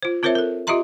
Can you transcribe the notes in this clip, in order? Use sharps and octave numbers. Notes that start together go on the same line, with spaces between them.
F4 C5
C4 F4 A#4 C5 C#5 E5
A4 A#4
F4 G4 D#5 E5 A#5 C6